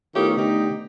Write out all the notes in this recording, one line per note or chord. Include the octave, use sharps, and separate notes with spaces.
D#3 A3 B3 E4 F4 G4 C#5
D3 D#4 G4